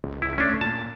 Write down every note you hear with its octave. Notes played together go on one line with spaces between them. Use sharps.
C#2
C#2 E4
A3 C#4 D4
A#2 A5